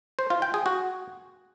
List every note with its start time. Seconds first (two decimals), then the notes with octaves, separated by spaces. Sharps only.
0.19 C5
0.30 F4
0.42 G5
0.54 G#4
0.66 F#4